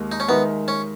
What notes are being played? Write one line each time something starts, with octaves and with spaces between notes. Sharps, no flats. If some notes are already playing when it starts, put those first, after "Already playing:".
Already playing: D#2 D#3 G#3
D#4
C#4
D#3 G#3 B3 D#4 A#4 E5
C#4